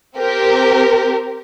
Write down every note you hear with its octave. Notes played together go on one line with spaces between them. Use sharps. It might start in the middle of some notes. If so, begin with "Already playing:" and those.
C4 G4 A#4